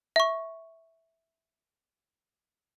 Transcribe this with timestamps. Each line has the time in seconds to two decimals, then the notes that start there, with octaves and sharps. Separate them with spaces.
0.16 E5 C#6